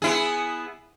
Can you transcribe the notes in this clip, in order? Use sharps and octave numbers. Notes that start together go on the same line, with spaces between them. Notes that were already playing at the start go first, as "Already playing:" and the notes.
B3 E4 G#4